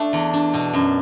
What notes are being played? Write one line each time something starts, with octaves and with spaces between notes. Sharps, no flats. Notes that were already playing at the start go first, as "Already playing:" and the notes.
Already playing: A3 D4
E2
D4
B2
F#2